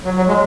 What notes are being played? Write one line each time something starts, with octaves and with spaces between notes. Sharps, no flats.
F#3
F#3
G#3